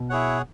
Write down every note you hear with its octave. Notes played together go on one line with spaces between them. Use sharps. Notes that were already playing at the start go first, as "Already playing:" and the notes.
Already playing: B2
E4 G#4 C#5 F#5